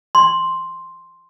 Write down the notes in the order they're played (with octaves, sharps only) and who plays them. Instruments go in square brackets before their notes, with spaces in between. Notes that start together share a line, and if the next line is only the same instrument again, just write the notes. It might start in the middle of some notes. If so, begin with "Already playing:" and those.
[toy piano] C6